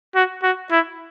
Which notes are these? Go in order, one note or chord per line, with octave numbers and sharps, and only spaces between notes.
F#4
F#4
E4